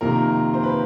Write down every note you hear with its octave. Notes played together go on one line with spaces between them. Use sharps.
F2 C3 D#3 A#3 A#4
C5
B4